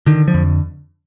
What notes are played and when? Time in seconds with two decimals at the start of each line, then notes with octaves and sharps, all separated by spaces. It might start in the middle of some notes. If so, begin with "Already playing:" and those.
0.06 D3 D#3
0.28 F3
0.34 F2